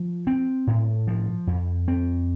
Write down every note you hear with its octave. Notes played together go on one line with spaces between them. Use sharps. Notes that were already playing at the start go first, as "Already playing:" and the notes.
Already playing: F3
C4
A2
F3
F2
C4